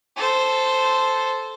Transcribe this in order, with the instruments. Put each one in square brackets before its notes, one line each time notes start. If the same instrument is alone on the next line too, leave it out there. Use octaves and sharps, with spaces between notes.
[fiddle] A4 C5